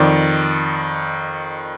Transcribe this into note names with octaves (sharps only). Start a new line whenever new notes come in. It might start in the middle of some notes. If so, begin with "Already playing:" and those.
Already playing: F2 D#3 D5